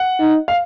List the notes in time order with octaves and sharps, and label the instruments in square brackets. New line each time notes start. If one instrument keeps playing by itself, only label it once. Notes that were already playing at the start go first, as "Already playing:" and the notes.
Already playing: [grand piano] F#5
[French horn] D#4
[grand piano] F5